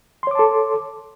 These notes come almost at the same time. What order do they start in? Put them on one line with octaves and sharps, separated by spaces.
C6 C#5 D6 A5 A4